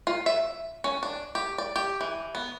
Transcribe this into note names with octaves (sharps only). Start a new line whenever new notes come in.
F4
E5
C#4
D4
G4
D5
G4
E3
B3